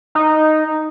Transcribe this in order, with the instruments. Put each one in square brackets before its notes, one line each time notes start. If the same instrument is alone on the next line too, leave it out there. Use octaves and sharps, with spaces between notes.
[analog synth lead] D#4